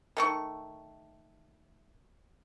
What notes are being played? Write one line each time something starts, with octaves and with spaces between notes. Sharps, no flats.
D#3 A3 C#6